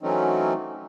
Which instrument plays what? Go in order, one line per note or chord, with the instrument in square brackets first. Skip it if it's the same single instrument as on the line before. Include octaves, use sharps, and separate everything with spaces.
[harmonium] E3 F#3 A3 C4 C#4 D#4